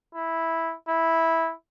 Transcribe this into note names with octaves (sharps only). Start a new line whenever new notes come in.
E4
E4